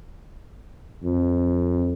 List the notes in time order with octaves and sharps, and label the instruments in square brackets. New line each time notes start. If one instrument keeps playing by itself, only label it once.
[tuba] F2